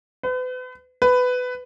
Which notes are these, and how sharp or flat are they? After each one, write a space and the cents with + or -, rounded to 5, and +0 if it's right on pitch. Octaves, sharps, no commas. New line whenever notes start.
B4 +40
B4 +15